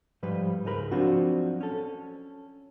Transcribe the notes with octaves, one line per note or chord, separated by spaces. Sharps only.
G#2 F3 G3 B4
C#2 G#2 G#4 A#4 B5
F3 F#3 C4 D4 F4 F#4
C#4 A4